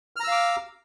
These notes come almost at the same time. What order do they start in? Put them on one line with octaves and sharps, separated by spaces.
F6 A#5 E6 F5 D6